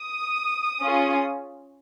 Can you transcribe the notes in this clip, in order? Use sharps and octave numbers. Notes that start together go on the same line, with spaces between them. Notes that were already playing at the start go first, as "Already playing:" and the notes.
Already playing: D#6
C#4 F4 G#4